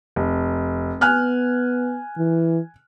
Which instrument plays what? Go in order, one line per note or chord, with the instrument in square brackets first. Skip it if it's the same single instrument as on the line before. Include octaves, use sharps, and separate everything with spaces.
[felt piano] F1
[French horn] B3 [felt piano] G#5 F6 F#6
[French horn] E3